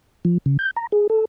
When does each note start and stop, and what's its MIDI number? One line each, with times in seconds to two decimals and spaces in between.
0.25 0.38 53
0.46 0.57 49
0.59 0.71 91
0.76 0.87 82
0.92 1.07 68
1.10 1.25 69